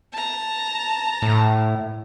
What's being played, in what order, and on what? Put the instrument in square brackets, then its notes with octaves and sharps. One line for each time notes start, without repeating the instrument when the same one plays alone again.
[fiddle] A5 A#5
[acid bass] A2